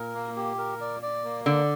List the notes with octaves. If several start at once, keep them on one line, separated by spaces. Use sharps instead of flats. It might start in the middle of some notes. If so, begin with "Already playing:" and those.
Already playing: A#2 A#4
A#3
G4
A#4
D5
D5
A#3
D3 D5